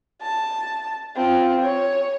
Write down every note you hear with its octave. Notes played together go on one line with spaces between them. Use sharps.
A5
C4 F4
C#5